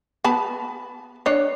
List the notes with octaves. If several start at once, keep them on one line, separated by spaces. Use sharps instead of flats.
B3 A5 B5
D4 C#5